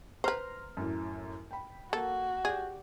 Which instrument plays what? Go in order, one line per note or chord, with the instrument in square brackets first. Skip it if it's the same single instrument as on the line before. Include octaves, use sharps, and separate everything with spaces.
[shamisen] B4 C5 [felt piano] A#5 C6 F6
[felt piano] F#2 A2
G5 B5
[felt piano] A#3 [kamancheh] F#4 [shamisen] A4
[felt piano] G4 D5 [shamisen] G#4